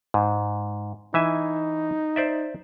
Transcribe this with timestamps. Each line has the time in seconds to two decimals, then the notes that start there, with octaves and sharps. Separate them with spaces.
0.14 G#2
1.14 E3 D#4 E5 G#5
2.16 C5 D5 E5